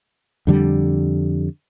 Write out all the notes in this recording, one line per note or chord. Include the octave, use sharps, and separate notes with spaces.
F2 D3 G3